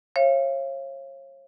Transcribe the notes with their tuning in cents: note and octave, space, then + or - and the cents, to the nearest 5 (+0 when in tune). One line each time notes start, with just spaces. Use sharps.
C#5 -35 F5 -35